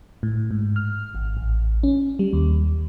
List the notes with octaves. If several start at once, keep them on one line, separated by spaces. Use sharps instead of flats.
A2
G#2
F6
G#1
A1
C#4
G3
D#2